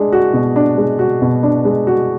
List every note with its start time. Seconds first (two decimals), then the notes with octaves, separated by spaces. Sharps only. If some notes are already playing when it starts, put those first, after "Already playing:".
Already playing: G#3 D4
0.12 F#4
0.34 B2
0.56 D4
0.78 G#3
0.99 F#4
1.22 B2
1.43 D4
1.65 G#3
1.87 F#4